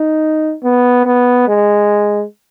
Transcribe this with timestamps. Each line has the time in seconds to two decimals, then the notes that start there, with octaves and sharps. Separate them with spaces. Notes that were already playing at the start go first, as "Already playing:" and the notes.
Already playing: D#4
0.63 B3
1.05 B3
1.48 G#3